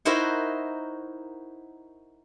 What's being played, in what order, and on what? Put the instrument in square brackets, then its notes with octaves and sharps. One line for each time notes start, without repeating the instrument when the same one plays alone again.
[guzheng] D#4 E4 F#4 A#4 C5 F#5